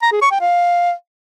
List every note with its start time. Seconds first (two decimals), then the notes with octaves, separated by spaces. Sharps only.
0.02 A#5
0.12 G#4
0.22 C#6
0.31 G5
0.41 F5